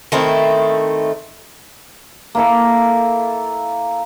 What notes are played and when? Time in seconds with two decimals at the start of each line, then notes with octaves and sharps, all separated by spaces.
0.12 D#3 A3 C4 E4
2.35 A#3 E4 A4